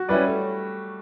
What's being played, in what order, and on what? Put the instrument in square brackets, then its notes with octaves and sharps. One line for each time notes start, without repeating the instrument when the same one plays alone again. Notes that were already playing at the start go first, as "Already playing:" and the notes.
Already playing: [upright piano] F#4
[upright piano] G3 [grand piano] C#4 E4 B4 D5
[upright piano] A3